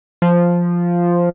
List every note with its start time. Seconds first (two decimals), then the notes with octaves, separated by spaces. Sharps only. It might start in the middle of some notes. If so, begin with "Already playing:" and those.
0.22 F3